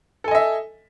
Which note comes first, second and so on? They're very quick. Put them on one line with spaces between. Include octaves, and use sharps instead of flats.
A4 G#5 D#5 E5